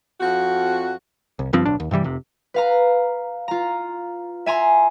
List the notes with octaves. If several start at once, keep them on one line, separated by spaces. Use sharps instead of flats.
F2 F#4
C2
F#1 G2 F3 C4
D1 B1 D4
D#2
G2 C3 E3 G3
F1 C3
B4 F5 A#5
F4 A#5
E5 G#5 A#5 C6